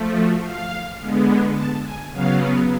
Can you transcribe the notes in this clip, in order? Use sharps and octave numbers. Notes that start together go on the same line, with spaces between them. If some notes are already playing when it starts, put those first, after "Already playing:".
Already playing: F3 A3
F#4
F5
D3 G#3 B3
A5
G#5
C#3 F#3 B3 F5